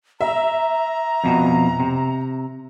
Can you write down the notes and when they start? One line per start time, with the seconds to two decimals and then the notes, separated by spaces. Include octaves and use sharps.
0.21 E5 A#5
1.24 F2 B2
1.80 C3